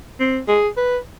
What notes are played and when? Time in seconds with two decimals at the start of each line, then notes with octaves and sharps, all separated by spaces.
0.20 C4
0.48 G#4
0.77 B4